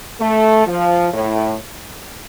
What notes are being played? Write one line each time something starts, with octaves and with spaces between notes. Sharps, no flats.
A3
F3
A2